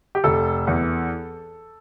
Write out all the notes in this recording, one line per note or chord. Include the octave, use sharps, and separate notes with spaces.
G4
F1 A4
E2 E3